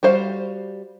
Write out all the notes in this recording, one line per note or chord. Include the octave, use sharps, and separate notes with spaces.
G3 F#4 C5 F5